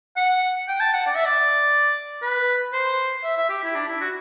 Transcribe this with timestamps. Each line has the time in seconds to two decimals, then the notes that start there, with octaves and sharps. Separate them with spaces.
0.16 F#5
0.68 G5
0.80 A5
0.93 F#5
1.06 D5
1.15 E5
1.25 D5
2.22 B4
2.73 C5
3.23 E5
3.37 E5
3.49 G4
3.63 E4
3.75 D4
3.88 E4
4.01 F#4